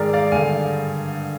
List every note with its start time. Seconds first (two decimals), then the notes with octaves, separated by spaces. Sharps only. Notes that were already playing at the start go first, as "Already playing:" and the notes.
Already playing: G#2 D#3 G#4 A#4 D5
0.13 D5 F5
0.32 G2 D3 F5 G#5